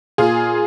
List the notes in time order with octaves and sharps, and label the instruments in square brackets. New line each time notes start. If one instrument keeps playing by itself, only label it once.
[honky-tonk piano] A#2 F4 G#4